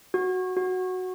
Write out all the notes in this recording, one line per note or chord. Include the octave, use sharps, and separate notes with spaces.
F#4
F#4